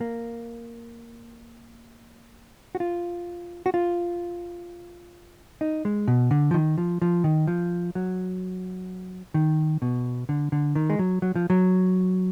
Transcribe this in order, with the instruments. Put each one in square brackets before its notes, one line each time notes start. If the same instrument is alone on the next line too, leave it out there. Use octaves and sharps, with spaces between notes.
[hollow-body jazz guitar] A#3
F#4
F4
F#4
F4
D#4
G#3
B2
D3
F3
D#3
F3
F3
D#3
F3
F#3
D#3
B2
D3
D3
D#3
G#3
F#3
F#3
F3
F#3